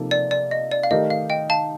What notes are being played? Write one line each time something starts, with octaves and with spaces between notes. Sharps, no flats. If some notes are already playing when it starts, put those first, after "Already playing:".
Already playing: C3 F3 A#3 D#4 A4
D5
D5
D#5
D5
F5
D#3 A3 D#4 G4 A#4 D#5
F5
D#5 G5
F5 A5